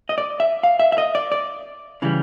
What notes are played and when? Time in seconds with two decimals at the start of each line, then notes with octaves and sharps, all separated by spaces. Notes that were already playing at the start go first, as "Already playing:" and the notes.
0.09 D#5
0.18 D5
0.40 E5
0.63 F5
0.80 E5
0.92 E5
0.98 D#5
1.15 D5
1.32 D5
2.02 C#3 E3 G3